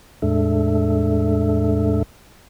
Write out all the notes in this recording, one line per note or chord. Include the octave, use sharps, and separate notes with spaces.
E2 A2 G#3 D4 A4 E5